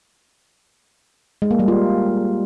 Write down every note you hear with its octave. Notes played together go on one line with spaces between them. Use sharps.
G#3
A#3
G3
F4